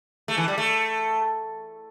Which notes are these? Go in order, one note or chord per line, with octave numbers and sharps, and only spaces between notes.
A3
E3
G3
A3